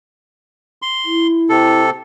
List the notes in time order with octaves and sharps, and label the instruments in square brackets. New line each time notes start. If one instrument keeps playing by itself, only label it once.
[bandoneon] C6
[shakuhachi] E4
[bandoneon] C3 A4